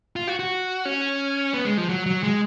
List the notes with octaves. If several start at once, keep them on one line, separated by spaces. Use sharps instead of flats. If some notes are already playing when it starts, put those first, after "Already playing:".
F4
F#4
F#4
C#4
B3
G#3
F3
F#3
F#3
G#3